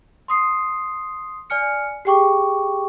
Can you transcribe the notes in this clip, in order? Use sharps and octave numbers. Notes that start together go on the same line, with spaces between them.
C6 D#6 C7
D5 G#5 F6 C#7
G4 G#4 G5 C#6 D6